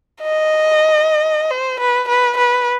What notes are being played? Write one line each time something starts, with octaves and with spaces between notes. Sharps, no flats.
D#5
C5
B4
B4
B4